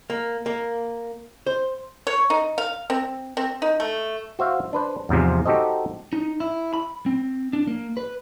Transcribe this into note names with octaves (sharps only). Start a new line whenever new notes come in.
A#3
A#3
C5
C#5
D#4
F5
C4
C4
D#4
A3
F#4 C5 E5 F5
D4 B4 C5
E2 G#2 C3 F3
D#4 F#4 G4 A4 C5 D#5
D#4
E4
B5
C4
D4
A#3
B4